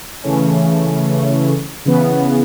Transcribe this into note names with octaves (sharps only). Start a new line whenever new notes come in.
C#3 E3 A3 C#4
C#3 E3 B3